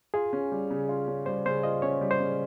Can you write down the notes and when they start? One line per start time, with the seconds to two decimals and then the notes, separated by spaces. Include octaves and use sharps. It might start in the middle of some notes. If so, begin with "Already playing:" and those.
0.14 F4 G#4
0.33 C#4
0.52 G3
0.71 C#3
0.89 F4
1.08 C#4
1.26 G3 C5
1.46 C#3 C5
1.63 F4 D#5
1.82 C#4 C#5
2.01 G3
2.11 C5
2.20 C#3